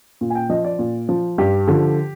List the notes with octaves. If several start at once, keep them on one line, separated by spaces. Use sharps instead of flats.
A#2
G#5
G5
F3 D#5
D5
A#2
F3
G2 G4
D3 F3